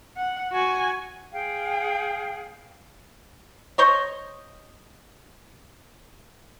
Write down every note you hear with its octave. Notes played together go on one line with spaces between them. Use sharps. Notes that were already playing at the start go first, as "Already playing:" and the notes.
F#5
F#4 G#5
G#4 F5 G5
C5 C#5 D#5